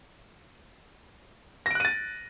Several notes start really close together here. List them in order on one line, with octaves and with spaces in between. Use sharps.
A#6 D7 F#6 D#7 A6